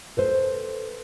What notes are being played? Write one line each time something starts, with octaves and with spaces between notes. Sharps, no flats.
A4 B4 C5